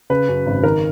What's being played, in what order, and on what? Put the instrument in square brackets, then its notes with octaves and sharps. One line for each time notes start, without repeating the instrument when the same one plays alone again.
[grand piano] C#3 B4
F#2
G#1
D#3 A#4